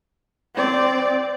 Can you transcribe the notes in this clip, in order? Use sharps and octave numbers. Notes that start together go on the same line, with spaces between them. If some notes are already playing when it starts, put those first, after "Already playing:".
C4 D5